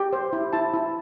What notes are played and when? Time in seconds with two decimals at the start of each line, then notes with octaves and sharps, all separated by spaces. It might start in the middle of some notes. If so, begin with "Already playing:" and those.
Already playing: G4 G5
0.13 C5
0.33 E4
0.53 E4 A5
0.74 E4